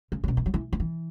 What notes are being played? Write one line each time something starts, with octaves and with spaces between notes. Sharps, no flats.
C#3
C#3
B2
D#3
F#3
E3
D#3
E3